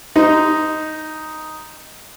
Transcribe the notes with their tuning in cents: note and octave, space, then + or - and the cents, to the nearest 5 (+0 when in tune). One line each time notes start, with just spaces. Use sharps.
D#4 +0 C5 -35